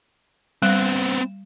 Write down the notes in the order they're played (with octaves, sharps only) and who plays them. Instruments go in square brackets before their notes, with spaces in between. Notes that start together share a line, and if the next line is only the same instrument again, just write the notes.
[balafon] G3 [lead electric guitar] B3 C4